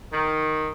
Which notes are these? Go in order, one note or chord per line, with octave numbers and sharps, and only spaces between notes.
D#3